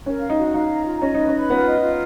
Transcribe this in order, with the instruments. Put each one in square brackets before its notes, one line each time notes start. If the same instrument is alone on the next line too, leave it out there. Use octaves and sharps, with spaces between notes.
[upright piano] C#4 [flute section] A#4
[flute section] F5
[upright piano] D#4
[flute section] F#4
[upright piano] D#4 [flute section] F5
[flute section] A#5
F4
[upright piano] C#4 [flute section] D#5
[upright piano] D#4 [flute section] B4
[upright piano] C#4
[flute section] B4
[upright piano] B3 [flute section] F4
[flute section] D#5
F4